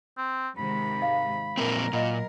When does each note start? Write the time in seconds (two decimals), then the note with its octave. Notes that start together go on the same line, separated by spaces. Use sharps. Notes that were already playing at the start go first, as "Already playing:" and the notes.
0.18 C4
0.58 G#2 C3 D#3 B5
1.02 F5
1.57 A#2 F#3 A#3 C4 A#4 A#5
1.93 A#2 D#5 F#5 B5